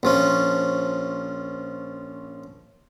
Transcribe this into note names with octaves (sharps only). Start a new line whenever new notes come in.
A#1 F3 C#4